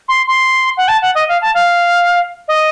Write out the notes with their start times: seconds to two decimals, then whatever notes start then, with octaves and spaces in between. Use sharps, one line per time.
0.08 C6
0.28 C6
0.77 F#5
0.88 A5
1.02 F#5
1.15 D#5
1.29 F5
1.42 A5
1.55 F5
2.48 D#5